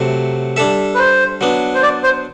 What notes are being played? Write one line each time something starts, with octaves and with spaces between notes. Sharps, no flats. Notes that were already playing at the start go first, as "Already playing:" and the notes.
Already playing: C3 F#3 A3
G3 D4 A4 E5
B4
C5
F#3 B3 D4
C5
D5
C5